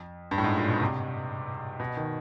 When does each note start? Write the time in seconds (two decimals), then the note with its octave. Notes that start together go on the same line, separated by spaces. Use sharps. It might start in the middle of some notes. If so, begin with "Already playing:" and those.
Already playing: F2
0.31 G2
0.38 A2
0.44 G#2
0.56 A#2
0.68 B2
0.81 C3
1.80 B2
1.97 D#3